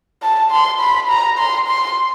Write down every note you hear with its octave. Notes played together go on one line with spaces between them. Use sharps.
A5
C6
B5
A#5
C6
C6